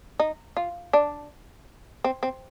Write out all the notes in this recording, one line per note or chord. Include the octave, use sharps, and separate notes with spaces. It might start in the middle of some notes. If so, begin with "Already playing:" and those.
D#4
F4
D4
C4
C4